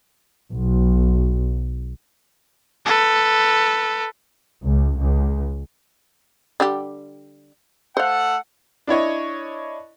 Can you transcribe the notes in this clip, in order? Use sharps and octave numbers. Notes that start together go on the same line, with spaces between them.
B1
A4 B4
C#2
C#2
D3 G3 G4
A3 A4 C5 F5 F#5
D4 E4 C#5 D#5